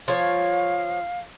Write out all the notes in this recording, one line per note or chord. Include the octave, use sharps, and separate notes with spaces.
F3 C#5 F5